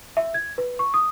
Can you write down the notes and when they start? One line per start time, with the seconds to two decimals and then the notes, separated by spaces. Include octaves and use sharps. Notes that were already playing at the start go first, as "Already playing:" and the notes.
0.17 E5
0.34 G#6
0.58 B4
0.79 C#6
0.94 D#6